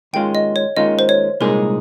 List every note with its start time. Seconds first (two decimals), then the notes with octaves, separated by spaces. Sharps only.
0.13 D#2 D#3 G#3 C#4 F4 G5
0.35 D#5
0.56 C#5
0.77 D#2 D#3 G#3 C#4 F4 D#5
0.99 C5
1.09 C#5
1.40 C2 A#2 G#3 D#4 G#4 A#4